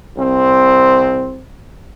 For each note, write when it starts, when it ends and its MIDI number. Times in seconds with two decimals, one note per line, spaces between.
0.17 1.41 36
0.17 1.41 60